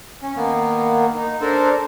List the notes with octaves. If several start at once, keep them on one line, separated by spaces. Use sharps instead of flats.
C#4
D#3 A#3 B3
D#4
D4 A4 A#4 C5